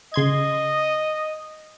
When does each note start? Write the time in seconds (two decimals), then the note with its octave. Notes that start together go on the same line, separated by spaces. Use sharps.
0.14 C#3 D#5 C6 G#6